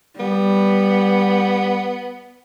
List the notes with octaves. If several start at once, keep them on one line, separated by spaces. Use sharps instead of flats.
G3 B3